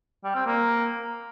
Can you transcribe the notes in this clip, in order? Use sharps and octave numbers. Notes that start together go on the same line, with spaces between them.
G3
C4
A#3